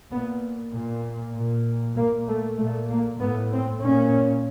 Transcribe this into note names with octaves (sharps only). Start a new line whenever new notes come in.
A#2 B3
A#2
A#2
A#2 A#3
A3
A#2 A3
A#3
A2 B3
C4
A#2 C#4